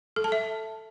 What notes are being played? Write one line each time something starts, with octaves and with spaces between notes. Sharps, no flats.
A4
A5
E5